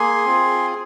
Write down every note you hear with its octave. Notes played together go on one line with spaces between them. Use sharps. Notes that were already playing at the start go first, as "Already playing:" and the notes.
Already playing: A#3 G#4 G#5 C6
C4 F4 G#4